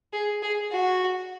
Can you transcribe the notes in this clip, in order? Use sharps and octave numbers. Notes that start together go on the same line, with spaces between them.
G#4
G#4
F#4